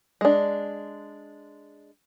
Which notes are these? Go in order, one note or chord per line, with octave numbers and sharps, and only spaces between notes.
G#3 D4